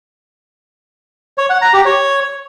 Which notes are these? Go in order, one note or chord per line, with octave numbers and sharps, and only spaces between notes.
C#5
F#5
A#5
G4
C#5